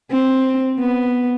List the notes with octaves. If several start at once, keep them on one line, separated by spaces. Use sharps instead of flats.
C4
B3